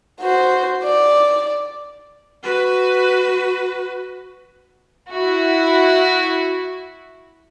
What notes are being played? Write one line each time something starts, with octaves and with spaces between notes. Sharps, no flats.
F#4 C5
D5
F#4 B4
E4 F#4